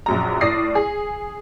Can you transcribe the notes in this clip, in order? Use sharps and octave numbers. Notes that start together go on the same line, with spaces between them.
A#1 F#2 A#5
A2 D5 D#6 A#6 C7
G#4